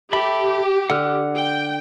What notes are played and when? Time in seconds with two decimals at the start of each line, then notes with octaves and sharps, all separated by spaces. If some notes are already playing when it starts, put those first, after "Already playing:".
0.13 G4 A4 E5 B5
0.90 D3 F#5 D6 F6
1.37 G5